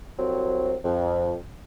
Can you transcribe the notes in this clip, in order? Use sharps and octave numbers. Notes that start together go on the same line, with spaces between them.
C2 F#3 C4
F2